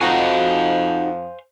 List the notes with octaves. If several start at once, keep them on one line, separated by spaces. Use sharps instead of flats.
F2 D#4 F#4 C5 F5 G#5